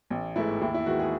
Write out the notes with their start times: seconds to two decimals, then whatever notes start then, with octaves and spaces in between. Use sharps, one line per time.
0.10 A1
0.36 G#2 E3 A3 E4
0.61 D#2 E4
0.74 E4
0.86 D#3 G#3 B3 F#4
1.00 G#4